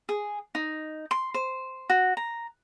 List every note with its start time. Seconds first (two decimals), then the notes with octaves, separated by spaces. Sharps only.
0.09 G#4
0.55 D#4
1.11 C6
1.34 C5
1.90 F#4
2.17 A#5